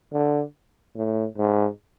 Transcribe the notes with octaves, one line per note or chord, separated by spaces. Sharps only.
D3
A2
G#2